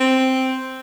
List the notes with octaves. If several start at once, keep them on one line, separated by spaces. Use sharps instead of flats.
C4